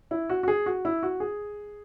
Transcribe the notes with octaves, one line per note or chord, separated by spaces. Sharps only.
E4
F#4
F#4
G#4
F#4
E4
F#4
G#4